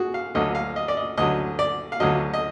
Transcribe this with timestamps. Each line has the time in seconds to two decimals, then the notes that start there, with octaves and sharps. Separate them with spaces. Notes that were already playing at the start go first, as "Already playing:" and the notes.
Already playing: F#4 G#4
0.14 F5
0.35 D2 D3 F#3 D#5
0.55 F5
0.76 D#5
0.88 D5
0.97 D#5
1.17 D2 D3 F#3 D#5
1.59 D5
1.92 F5
2.00 D2 D3 F#3 D#5
2.34 D#5